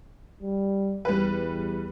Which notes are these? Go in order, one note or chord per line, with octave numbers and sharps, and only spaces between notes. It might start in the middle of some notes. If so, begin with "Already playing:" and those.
G3
E2 G3 B4